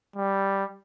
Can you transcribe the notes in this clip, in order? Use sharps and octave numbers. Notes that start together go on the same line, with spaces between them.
G3